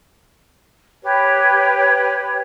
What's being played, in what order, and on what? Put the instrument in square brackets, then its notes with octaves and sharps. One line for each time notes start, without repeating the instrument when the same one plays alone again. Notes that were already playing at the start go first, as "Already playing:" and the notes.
[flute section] G4 B4 C#5